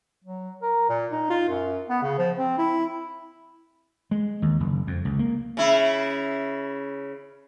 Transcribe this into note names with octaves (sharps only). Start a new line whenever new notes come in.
F#3
A#4
A#2
D#4
F4
F#2
B3
C#3
F3
C4
E4
G#3
D#2
F#1
F2
C#2
A#3
C#3 E4